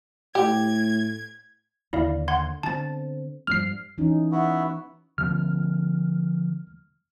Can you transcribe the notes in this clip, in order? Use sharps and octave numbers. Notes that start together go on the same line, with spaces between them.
A2 G4 G#6
D#2 D3 E4 D5 F5
F#5 C6 G#6
D3 B3 C4 A5 A6
G2 F3 G3 F6 C7
E3 C#4 D#4
B3 E4 F#4
D3 F3 B3 F6